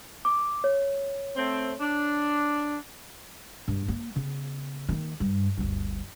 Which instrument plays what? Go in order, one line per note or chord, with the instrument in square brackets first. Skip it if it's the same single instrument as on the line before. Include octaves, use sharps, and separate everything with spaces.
[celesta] D6
C#5
[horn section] A3 C4
D4
[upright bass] G2
A#3
C#3 B3
D#3 A#3
G2
G1 D2